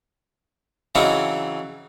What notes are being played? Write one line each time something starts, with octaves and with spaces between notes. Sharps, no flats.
C#3 E3 F#3 C4 C#4 D#4